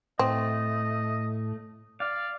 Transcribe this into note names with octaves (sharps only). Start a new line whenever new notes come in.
A2 A3 C4 D#5
D5 F5